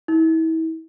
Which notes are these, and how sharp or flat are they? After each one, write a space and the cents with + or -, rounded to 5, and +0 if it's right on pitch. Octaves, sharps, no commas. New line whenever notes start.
E4 -35